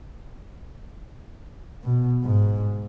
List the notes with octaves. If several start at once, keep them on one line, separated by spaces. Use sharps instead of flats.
B2
G#2